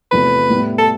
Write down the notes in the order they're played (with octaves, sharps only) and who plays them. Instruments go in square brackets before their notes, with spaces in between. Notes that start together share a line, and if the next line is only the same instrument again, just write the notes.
[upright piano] E2 C3 F3 A3 [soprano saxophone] B4
[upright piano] A2 G3 B3 E4
[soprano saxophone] A4